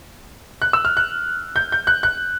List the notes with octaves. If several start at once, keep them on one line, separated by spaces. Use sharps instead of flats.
F#6
E6
F6
F#6
G6
G6
F#6
F#6